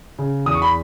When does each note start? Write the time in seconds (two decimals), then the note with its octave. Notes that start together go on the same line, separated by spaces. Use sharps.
0.19 C#3
0.46 E2 D#6
0.54 C#6
0.62 B5